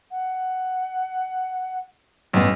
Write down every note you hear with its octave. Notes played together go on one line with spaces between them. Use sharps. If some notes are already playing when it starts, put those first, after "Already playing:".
F#5
A1 G2 B3